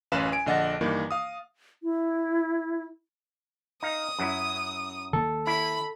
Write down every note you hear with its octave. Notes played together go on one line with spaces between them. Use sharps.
A1 F#2 C#4 B4 F5 E7
G#5 D7
A#1 D3 D#5 F#5 A6 A#6
G2 D#3 E3 A#3
F5 D#6
E4
D#4 F5 D#6
F#2 F#3 E4
D#3 A#3 A4
E4 B5